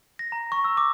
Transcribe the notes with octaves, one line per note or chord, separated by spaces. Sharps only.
A#6
A#5
C#6
E6
D6